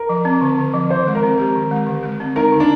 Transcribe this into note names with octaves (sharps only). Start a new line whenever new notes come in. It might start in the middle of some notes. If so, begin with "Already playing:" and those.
Already playing: A#4
F3
C4
D3
D3
F3
D#3 C5
G#3
A#4
C4
G4
D#3
G#3
D3
G#3
C4
D#4 A#4
D3
D4